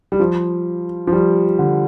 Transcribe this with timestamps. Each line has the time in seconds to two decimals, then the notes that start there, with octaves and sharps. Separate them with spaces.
0.12 G3
0.20 F3
1.07 F3
1.13 G3
1.59 D3